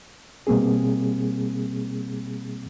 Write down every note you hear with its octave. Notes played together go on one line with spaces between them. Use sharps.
B2 G3 A#3 C4 G#4